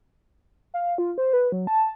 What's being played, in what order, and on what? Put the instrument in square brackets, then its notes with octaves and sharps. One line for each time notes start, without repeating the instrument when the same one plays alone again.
[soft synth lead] F5
F4
C5
B4
F#3
A5